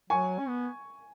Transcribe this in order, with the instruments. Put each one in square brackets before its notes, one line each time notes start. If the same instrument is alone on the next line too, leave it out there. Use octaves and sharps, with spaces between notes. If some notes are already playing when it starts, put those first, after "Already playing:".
[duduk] F#3 [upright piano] G#5 C#6
[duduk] C#4
B3